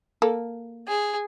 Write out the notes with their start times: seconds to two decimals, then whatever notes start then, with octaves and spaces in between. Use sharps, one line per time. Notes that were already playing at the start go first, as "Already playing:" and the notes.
0.22 A#3 A4
0.88 G#4